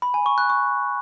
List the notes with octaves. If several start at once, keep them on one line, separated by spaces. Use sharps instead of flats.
B5
G#5
C#6
F#6
C#6